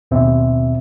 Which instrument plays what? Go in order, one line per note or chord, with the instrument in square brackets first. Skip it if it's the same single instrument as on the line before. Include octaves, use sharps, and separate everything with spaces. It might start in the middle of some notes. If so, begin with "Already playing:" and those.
[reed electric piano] D#2 B2 C4 E5